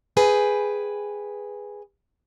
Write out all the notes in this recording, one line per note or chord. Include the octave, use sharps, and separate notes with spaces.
G#4 B4 G5